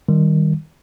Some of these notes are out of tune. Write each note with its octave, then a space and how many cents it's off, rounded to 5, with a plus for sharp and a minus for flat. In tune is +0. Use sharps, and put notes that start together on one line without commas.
D#3 +0 G3 +0